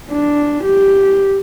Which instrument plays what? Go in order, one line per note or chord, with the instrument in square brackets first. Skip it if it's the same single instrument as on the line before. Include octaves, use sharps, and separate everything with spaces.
[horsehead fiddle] D4
G4